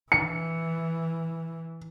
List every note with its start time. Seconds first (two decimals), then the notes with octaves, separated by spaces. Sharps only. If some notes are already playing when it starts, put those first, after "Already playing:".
0.12 E3 C#7